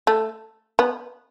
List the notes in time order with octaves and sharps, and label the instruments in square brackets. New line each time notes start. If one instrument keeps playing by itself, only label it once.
[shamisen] A3
B3